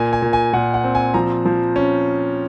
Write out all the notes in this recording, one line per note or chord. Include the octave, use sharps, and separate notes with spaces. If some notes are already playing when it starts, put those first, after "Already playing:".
Already playing: A#2 G#5
G#5
A#2
G#5
A#2 F#5
F#5
C4
G#5
F3 A#5
F3
C#4